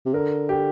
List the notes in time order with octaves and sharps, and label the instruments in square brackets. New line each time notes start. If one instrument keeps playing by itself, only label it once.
[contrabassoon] C3
[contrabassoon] D3 [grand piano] A#4
[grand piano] G4